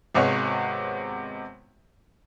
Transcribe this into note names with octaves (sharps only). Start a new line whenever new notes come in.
G#1 C3 G#3 B3 C#5 F#5